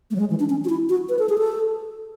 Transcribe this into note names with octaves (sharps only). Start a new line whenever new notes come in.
A3
F#3
G#3
E3
D4
C#4
F#4
E4
F#4
B4
A4
G#4
A4